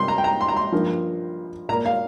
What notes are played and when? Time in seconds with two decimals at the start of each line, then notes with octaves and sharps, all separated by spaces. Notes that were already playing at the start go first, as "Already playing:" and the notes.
Already playing: C3 G3 A#3 C6
0.08 A#5
0.18 G5
0.24 A#5
0.41 C6
0.48 A#5
0.56 C6
0.72 G2 F3 A#3
1.69 A#2 A#5
1.72 A#3
1.86 F5